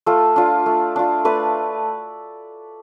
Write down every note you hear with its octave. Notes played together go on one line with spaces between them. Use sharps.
A3 F4 A4
D4 F4
A3
D4 F4
A3 B4 D5